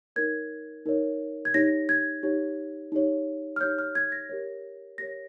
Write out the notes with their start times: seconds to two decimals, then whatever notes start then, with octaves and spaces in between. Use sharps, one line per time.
0.16 D#4 A#4 C#5 G#6
0.86 D#4 A#4 C#5
1.45 G#6
1.54 D#4 G4 C#5 A#6
1.89 G#6
2.23 D#4 G4 C#5
2.92 D#4 G4 C#5
3.56 F6
3.61 D#4 G4 C#5 G6
3.78 F6
3.95 G#6
4.12 A#6
4.29 G4 A#4 C#5
4.98 G4 A#4 C#5 A#6